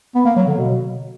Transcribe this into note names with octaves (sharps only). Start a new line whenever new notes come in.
B3
A#3
F#3
D3
B2